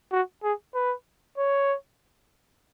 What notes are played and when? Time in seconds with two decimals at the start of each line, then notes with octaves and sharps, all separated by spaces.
0.12 F#4
0.43 G#4
0.74 B4
1.38 C#5